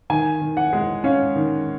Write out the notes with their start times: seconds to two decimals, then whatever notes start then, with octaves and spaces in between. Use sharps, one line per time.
0.10 D#3 G#5
0.41 D#3
0.57 F#5
0.73 G#3
1.04 C#4 F5
1.36 D#3